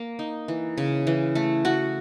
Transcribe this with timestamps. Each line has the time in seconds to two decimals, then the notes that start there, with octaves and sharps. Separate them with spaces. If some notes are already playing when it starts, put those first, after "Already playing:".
Already playing: A#3
0.19 D#4
0.48 E3
0.78 C#3
1.07 E3
1.35 A3
1.65 F#4